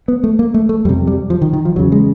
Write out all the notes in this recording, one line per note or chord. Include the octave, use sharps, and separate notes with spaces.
B3
A3
A#3
A3
A3
F2 C3 G3
G3
F3
D#3
D#3
F3
E2 C#3 F#3
G#3